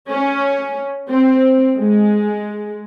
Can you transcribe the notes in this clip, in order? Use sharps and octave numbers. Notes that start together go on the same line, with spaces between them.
C#4
C4
G#3